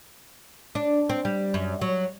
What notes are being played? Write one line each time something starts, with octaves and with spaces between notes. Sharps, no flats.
D4
C4
G3
F#2
F#3